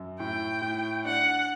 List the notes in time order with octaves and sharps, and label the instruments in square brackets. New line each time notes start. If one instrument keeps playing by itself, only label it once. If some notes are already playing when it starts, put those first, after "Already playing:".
Already playing: [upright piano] F#2
[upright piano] A2 [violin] G5
[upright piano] A2
[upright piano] D4 [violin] F#5